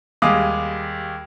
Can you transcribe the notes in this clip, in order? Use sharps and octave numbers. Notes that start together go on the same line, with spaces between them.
D#2 G3 G#3 F5 D6 D#6